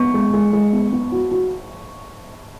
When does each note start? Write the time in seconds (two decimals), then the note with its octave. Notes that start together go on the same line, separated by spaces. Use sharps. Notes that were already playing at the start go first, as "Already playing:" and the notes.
Already playing: B3 C#6
0.14 G#3
0.33 G#3
0.53 G#3
0.73 B3
0.92 B3
1.12 F#4
1.31 F#4